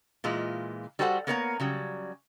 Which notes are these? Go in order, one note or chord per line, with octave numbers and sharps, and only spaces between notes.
A#2 E3 G#3 F4
G3 F#4 A4 C5 F5 F#5
A#3 B3 A#4 C#5 F5 A#5
C#3 F#3 G3